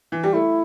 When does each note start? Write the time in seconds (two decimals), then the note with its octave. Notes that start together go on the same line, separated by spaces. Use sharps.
0.12 E3
0.23 G3 G4
0.33 A3 E4